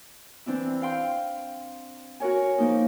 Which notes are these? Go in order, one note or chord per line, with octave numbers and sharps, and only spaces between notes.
E3 C4 D4 E4
F5 G5 C6
F#4 A#4 C#5 G#5
F3 A#3 D#4